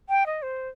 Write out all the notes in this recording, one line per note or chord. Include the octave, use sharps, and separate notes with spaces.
G5
D#5
C5